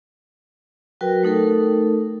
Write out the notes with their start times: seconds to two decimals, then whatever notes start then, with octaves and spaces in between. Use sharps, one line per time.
1.01 F#3 F#4 A#4 B4 G5
1.23 A3 D#4 A4 A#4